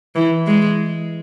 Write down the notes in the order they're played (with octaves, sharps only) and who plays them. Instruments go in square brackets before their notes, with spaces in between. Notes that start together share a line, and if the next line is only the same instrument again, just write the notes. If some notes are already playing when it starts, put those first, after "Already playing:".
[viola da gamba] E3
G#3